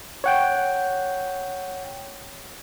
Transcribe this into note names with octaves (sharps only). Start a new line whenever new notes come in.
C#5 F#5 G5